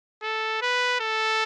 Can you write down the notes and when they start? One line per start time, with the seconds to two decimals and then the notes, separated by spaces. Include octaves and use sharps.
0.23 A4
0.62 B4
1.00 A4